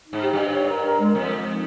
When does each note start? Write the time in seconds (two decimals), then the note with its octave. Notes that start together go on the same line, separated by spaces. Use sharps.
0.08 G#2 D#4
0.23 G4
0.33 G2 G4
0.54 C#5
0.69 A#4
0.84 A#4
1.00 G#3
1.15 F2 G#3
1.30 F3
1.46 D#4